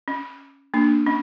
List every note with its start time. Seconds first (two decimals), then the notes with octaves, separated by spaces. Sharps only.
0.08 C#4
0.74 A#3 D4
1.06 C#4